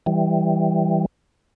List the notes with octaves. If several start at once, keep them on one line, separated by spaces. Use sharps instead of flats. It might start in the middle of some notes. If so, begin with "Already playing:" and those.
E3 G3